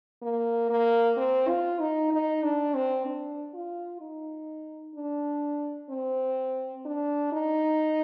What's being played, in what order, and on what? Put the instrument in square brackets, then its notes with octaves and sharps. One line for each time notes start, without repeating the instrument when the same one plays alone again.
[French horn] A#3
A#3
C4
F4
D#4
D#4
D4
C4
D4
F4
D#4
D4
C4
D4
D#4